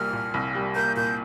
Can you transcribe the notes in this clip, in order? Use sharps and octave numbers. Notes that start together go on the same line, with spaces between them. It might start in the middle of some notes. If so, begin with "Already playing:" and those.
Already playing: C2 A#2 G3 A#3 F6
A#2
C2
G3
A#3 G6
A#2 G6